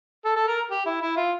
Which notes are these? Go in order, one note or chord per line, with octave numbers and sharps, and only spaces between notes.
A4
A4
A#4
G4
E4
E4
F4